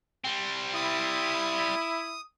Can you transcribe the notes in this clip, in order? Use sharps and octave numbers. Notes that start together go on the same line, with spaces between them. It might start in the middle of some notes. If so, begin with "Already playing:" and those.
G3 C4
E4 D#6